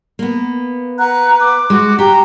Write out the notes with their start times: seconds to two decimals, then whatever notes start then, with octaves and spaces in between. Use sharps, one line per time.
0.19 A#3 B3
0.99 B4 F#5 A#5 F#6
1.40 D6
1.70 G#3 F#4
1.99 G4 G5 A#5